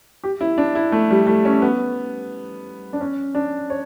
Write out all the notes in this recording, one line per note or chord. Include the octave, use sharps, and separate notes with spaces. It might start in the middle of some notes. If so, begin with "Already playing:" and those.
G4
E4
D4
E4
A3
G3
A3
C#4
B3
D4
C#4
D4
C#5